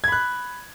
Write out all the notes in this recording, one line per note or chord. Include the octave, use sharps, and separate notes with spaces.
B5 F#6 G#6